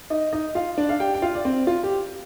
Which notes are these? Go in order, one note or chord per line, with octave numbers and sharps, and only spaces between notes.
D#4 D#5
D#4 D#5
F4 F5
D4 D5
F5
G4 G5
G5
F4 F5
D5
C4 C5
F4
G4